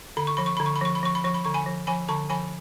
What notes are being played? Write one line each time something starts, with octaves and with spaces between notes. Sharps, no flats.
D3 B5
C#6
F3 B5
C#6
D3 B5
C#6
B5
F3 C#6
B5
F3 C#6
B5
F3 C#6
B5
D3 C#6
G#5 B5
F3
F3 G#5 B5
D3 A5 C#6
F3 G#5 B5